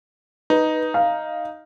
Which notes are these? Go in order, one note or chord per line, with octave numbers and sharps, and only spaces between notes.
D#4 B4
F5